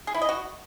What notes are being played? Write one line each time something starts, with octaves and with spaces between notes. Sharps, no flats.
G#4
E4
D#5
F#4